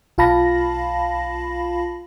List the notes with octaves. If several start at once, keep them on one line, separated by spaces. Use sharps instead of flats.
B1 F4 F5 A5 B5 A#6